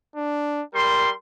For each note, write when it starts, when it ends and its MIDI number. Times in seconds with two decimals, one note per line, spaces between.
0.16 0.63 62
0.75 1.09 55
0.75 1.14 70
0.75 1.09 84